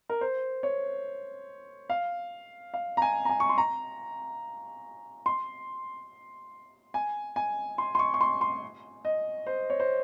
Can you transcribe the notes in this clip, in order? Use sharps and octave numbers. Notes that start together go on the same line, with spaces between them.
A#4
C5
C#5
F5
F5
A#5
G#5
A#5
G#5
C#6
C6
A#5
C6
G#5
G#5
C6
C6
C#6
C#6
C6
C6
D#5
C5
C#5
C5